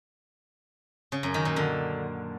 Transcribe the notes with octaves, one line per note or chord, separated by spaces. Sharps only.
C#3
F#2
D#3
A#2
D3